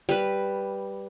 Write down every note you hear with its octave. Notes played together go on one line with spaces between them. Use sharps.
G3 B4